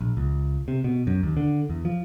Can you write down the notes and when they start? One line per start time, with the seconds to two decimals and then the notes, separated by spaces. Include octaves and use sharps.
0.01 A#1
0.17 C#2
0.68 C3
0.84 B2
1.07 F#2
1.23 D#2
1.37 D3
1.70 E2
1.85 F3